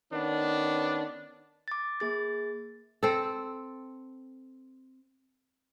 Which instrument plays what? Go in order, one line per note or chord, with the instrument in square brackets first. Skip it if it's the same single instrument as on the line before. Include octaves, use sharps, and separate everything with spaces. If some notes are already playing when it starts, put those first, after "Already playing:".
[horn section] D#3 B3 C#4 D4
[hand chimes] D6 A6
A#3 G#4 A6
[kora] C4 A4